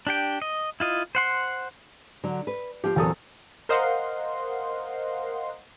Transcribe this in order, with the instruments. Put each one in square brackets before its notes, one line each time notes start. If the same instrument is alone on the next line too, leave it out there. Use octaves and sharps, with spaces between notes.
[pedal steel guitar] D4 G4 G5
D#5
E4 F4 D#5
C5 F#5 C6
[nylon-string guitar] D3 F#3
B4
[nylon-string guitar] F3 F4 [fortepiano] G4
[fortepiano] E2 A4 D#6 [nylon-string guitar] A#2 F#3 C4
[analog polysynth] A#4 C5 D#5 F5 F#5 C6